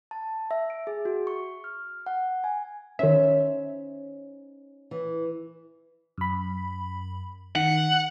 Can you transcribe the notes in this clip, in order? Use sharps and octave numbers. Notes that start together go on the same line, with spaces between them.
A5
E5
D7
G#4
F#4
C#6
F6
F#5
G#5
D#3 C#4 D#4 C5 E5
E3
F#2 B5
D#3 F#5